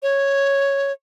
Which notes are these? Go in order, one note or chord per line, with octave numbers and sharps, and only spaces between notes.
C#5